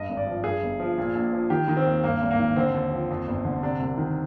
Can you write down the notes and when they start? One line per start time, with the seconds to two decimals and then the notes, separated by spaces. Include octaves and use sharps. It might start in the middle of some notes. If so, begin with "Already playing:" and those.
Already playing: G2 D#5
0.09 G#1
0.17 D5
0.27 F3
0.44 G2 G#4
0.63 G1
0.80 F3
0.98 A#2
1.15 A#1
1.33 F3
1.50 D#3 G4
1.68 D#3
1.77 C4
1.86 D#2
2.04 G2 A#3
2.21 G#1
2.31 A#3
2.39 D#3
2.56 D3 C4
2.75 D#2
2.91 F3
3.10 F2
3.27 G1
3.45 D3
3.62 C3 D4
3.80 C2
3.98 D#3